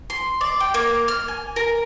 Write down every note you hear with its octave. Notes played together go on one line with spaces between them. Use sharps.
C6
D5
G5
A#3
F6
G#5
A#4